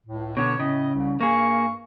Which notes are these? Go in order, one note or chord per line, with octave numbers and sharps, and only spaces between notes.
C#2 A2
B2 D3 B3 D4 C#5
A2 C#3 E4 D#5
C2
G2 A#3 G#4 F5 C#6